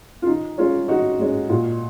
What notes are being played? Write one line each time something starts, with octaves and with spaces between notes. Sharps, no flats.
F4
D#3 D#4
G#3 C#4 F4
D#3 D#4 F#4
G#3 C#4
A#2